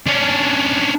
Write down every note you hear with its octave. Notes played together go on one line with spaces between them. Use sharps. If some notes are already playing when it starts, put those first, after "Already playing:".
C#4 D4